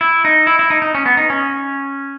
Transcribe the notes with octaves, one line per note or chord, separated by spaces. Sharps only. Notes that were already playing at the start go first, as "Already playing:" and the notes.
E4
D#4
E4
E4
D#4
D#4
C#4
B3
D#4
C#4